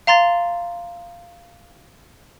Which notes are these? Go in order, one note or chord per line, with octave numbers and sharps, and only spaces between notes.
F5 A#5 C6 A6